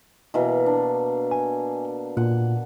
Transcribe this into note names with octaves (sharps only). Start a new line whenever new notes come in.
B2 E3 A#3
D4
G#5
A#2 F#5